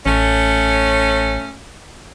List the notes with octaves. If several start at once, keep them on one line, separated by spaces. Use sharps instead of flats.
A1 A3 C#4